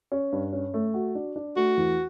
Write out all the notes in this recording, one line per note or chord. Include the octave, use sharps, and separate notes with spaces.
C#4
G2
C#4
A3
F#4
D4
D4
A3 F#4
E2